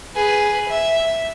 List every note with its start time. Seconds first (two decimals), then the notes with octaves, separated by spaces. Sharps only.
0.15 G#4 B4
0.69 E5